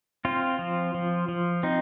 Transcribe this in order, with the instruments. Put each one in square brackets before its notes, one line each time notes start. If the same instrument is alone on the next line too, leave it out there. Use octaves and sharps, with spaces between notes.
[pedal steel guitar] C4 F4
F3
F3
F3
C4 D#4